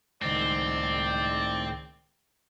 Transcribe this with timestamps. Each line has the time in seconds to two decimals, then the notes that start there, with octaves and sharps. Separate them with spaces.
0.22 C#2 A2 D#3 G#3 C4 D#4 D5